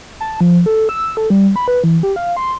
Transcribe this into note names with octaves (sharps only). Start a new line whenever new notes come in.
A5
F3
A4
E6
A4
G3
B5
B4
E3
G4
F5
C6